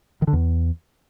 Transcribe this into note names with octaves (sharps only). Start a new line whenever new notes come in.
D#3
D3
E2